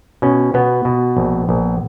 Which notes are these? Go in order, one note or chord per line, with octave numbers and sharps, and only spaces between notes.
B2 C#4
B2 B3
B2
A#1
A#1